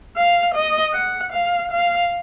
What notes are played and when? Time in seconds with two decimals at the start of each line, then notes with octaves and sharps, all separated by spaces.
0.16 F5
0.55 D#5
0.94 F#5
1.33 F5
1.72 F5